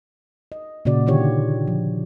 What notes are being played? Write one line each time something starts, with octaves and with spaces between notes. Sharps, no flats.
D#5
A#2 C#3 F#4 D5
D3 D#3 F4 G4 C#5
F3